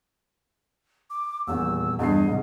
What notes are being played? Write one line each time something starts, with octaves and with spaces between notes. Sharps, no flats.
D6
D#1 E2 E6
E2 G2 D#5 C7
G#2 C3